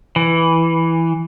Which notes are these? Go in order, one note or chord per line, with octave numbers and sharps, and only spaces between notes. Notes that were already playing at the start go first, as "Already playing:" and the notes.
E3